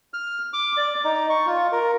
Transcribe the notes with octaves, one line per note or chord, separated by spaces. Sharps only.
F6
D6
D5
D#4
C#6
F4
A#4